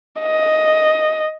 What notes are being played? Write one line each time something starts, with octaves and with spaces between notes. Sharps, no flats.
D#5